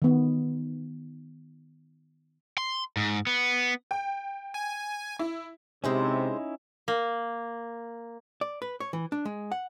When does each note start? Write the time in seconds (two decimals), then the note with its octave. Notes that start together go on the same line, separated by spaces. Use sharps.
0.02 D#3 B3
2.58 C6
2.97 G#2
3.27 B3
3.91 G5
4.54 G#5
5.19 E4
5.84 C3 G#3 C#4 D#4 E4 C5 E5
6.88 A#3
8.41 D5
8.62 B4
8.80 C#5
8.93 E3
9.12 D4
9.25 G#3
9.52 F#5